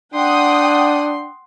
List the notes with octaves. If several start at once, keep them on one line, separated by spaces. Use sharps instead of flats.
D4 F#5 G5 C6 D#6